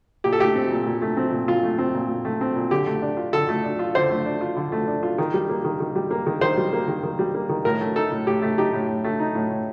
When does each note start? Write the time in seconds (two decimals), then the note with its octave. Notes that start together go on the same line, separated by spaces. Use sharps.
0.24 A#2 G4
0.33 A4
0.39 A3 G4
0.55 C4
0.71 A#2
0.86 A#2
1.02 A3
1.17 C4
1.32 A#2
1.48 A#2 F4
1.63 A3
1.78 C4
1.94 A#2
2.09 A#2
2.25 A3
2.41 C4
2.56 A#2
2.71 D3 G4
2.87 A3
3.02 D4
3.17 F4
3.33 D3 A4
3.49 A3
3.64 D4
3.79 F4
3.95 D3 C5
4.10 A3
4.26 D4
4.41 F4
4.56 D3
4.72 A3
4.87 D4
5.03 F4
5.18 D#3
5.34 G3
5.49 A#3
5.65 D#3
5.80 D#3
5.96 G3
6.11 A#3
6.27 D#3
6.41 D#3 C5
6.57 G3
6.73 A#3
6.88 D#3
7.03 D#3
7.19 G3
7.34 A#3
7.49 D#3
7.65 A2 A#4
7.81 A3
7.96 D#4 A4
8.12 A2
8.27 A2 G4
8.42 A3
8.58 D#4 G4
8.73 A2
8.89 A2
9.04 A3
9.19 D#4
9.35 A2
9.50 A2